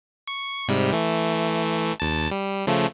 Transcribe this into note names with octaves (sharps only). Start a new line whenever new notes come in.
C#6
G#2 C3 G3
E3 A3
D#2 A5
G3
C#3 F3 A3